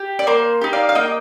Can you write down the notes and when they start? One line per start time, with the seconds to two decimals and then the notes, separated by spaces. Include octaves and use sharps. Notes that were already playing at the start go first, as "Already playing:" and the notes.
Already playing: G4
0.19 D5
0.27 A#3 C5
0.61 D#4 G4
0.73 D5 F5
0.89 F5
0.95 A#3 D#5 G5